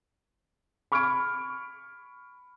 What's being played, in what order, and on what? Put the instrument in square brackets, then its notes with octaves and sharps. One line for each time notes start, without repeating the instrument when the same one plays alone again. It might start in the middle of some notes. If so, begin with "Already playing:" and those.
[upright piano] B5 C#6 F6 G#6 D7